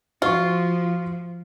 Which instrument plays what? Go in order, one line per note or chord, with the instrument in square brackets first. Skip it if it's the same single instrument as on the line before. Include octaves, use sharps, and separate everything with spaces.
[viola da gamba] F3 [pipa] F4 [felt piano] F#4 C#6